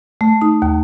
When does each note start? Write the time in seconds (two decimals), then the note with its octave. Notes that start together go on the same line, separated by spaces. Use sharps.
0.21 A3
0.42 D#4
0.62 D#2